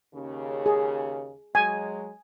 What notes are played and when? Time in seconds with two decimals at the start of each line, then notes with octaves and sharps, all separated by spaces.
0.14 D#2 C#3
0.66 G#4
1.55 F#3 G#3 G#5